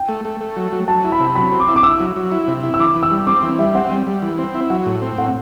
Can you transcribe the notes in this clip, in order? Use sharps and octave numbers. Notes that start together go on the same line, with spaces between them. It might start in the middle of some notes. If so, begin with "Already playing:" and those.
Already playing: G5
A3
A3
A3
F#3
F#3
F#3 A5
E4
B5
C3
F#3 B5
C4
D6
E4
D6
E4 E6
F#3
F#3
E4
C3
E4
E6
E3 D6
E3
E6
G3
C4 D6
E3
G3 E5
C4 F#5
G3
G3
E3
C4
E4
F#3 F#5
A2
C4
A2 F#5